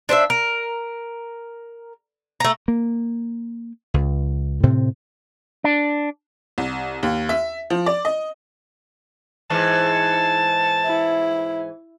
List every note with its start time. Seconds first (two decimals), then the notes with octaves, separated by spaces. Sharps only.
0.09 D4 C5 D5 E5
0.30 A#4
2.40 A3 A#5
2.68 A#3
3.94 C#2
4.63 A2 C3 C4
5.64 D4
6.58 C2
7.03 D#2
7.29 E5
7.70 F3
7.86 D5
8.05 D#5
9.50 G#2 E3 A5
10.86 E4